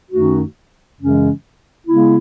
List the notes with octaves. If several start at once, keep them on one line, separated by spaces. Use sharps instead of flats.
F#2 D#3 A3 D#4 F#4
F#2 C#3 E3 G#3 C#4
C#3 G#3 B3 E4